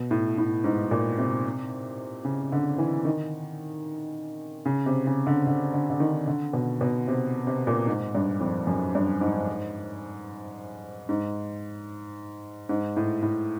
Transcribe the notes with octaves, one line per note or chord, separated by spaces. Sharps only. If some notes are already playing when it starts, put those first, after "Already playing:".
Already playing: B2
A2
A2
G#2
A#2
C3
C#3
D3
E3
D#3
C#3
C3
C#3
D3
D3
D3
D3
D#3
D3
B2
B2
C3
C3
A#2
G#2
G2
F2
F#2
G2
G#2
G#2
G#2
A2
A2